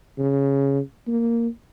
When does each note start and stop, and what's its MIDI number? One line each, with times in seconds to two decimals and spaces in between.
0.18 0.80 49
1.07 1.48 58